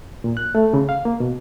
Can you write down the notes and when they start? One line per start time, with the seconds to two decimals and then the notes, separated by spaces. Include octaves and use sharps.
0.24 A#2
0.37 F#6
0.55 A3
0.74 C#3
0.89 F5
1.05 A#3
1.20 B2